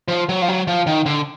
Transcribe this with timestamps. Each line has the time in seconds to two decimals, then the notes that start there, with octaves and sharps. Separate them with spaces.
0.08 F3
0.29 F#3
0.42 F3
0.48 F#3
0.67 F3
0.87 D#3
1.06 D3